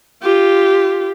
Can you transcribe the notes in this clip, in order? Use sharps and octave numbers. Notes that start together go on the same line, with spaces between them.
F4 G4